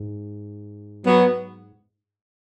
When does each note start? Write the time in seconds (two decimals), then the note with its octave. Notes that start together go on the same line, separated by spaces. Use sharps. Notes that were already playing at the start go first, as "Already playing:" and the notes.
Already playing: G#2
1.05 F#3 B3